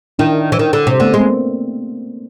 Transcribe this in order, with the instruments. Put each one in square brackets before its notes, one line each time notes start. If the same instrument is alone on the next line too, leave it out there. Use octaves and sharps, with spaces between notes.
[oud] D#3 [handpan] D4 E4
[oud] E3
D#3
D3
C3
[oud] D3 [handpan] A3 B3
[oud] G#3
[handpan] A#3 C4